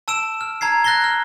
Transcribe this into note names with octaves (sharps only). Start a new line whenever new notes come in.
A5 E6 D7 E7
F6
A5 A#5 G#6 C7
F#6 A6 A#6 C7 G7
F6